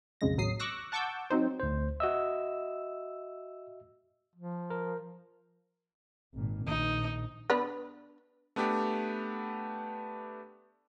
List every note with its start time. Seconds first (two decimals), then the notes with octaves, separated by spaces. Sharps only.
0.21 B1 F2 C#3 G#3 A#6
0.38 A1 D#2 F#3 D#6 C7
0.60 C#6 D6 E6 F#6 A#6
0.92 F#5 A5 C#6 D6 E6 G6
1.30 F#3 C4 D#4 C5
1.60 D2 C5
2.00 F#4 D#5 E5 E6
4.36 F3
4.70 A#4
6.34 G#1 A#2
6.67 A#1 A#2 D#3 D#4
7.50 B3 D4 B4
8.56 A3 B3 D4 G4